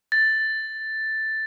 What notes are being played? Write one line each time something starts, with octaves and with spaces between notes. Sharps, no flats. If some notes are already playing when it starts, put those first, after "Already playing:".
A6